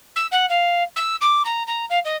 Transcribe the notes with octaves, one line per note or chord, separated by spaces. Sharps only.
E6
F#5
F5
E6
D6
A#5
A#5
F5
D#5